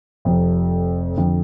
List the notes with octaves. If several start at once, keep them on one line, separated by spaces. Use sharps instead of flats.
F1 F2 C3 F3
F2 D3 F3